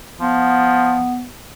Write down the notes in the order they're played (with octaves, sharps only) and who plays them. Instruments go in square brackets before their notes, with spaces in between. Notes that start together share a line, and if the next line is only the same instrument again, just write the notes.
[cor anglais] F3 [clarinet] B3